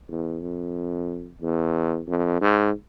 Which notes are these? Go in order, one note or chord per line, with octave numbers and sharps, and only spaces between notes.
E2
F2
E2
F2
G#2